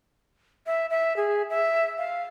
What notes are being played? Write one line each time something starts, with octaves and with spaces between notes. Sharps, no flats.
E5
E5
G#4
E5
F5